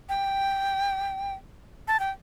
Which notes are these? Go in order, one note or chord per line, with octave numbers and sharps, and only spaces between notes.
G5
A5
G5